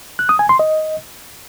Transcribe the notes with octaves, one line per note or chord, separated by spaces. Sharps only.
F#6
D#6
G#5
C6
D#5